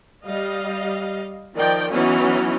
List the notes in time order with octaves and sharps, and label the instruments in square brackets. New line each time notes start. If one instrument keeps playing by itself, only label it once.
[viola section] G3 D#5 F5
D#3 F3 D5 G5
E3 F#3 B3 C#4 D#4